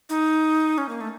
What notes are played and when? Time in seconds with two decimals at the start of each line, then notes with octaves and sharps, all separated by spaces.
0.09 D#4
0.78 C#4
0.89 A#3
1.01 A3